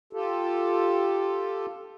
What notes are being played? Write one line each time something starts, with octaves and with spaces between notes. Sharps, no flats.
F4 G4 A4